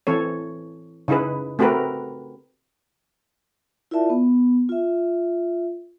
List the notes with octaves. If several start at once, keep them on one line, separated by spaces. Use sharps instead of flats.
E3 C4 A4 C#5
C#3 D#4 E4 G#4 B4
A3 C4 F#4 G4 A#4 B4
E4 F4 A#4 D5 E5 A5
B3
F4 E5